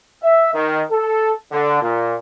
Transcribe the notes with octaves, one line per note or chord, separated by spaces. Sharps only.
E5
D#3
A4
D3
A#2